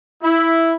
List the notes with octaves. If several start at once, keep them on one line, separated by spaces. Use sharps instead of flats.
E4